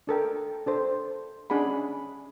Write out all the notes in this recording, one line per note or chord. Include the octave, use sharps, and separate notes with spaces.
D4 A4 A#4 G5
D4 A4 C5
C#4 D4 G#4 F#5 B5